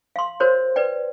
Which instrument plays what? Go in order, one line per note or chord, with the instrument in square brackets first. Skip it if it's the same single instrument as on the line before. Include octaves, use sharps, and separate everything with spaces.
[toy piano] F5 C6
F#4 A#4 C5 C#5
B4 D5 G5